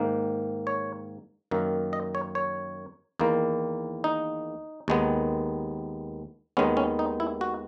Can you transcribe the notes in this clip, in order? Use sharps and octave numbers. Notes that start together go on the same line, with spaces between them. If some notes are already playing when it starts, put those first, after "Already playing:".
Already playing: G#2 D#3 A#3
C#5
F#2 D#3 A#3
D#5
C#5
C#5
E2 D#3 A#3
D#4
D#2 D#3 G#3 B3
D#2 D#3 G#3 B3 C#4
C#4
D#4
E4
F#4